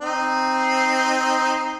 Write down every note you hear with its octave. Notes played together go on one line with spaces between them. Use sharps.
C4 D#4